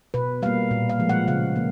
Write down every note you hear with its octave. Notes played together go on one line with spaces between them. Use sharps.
B2 B4
G3 A#3 F5
A#2
F5
F3 G#3
F#5
C#3 F5
A#3